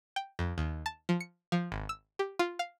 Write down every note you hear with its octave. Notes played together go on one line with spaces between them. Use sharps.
G5
F2
D#2
A5
F3
C#7
F3
G#1
E6
G4
F4
F5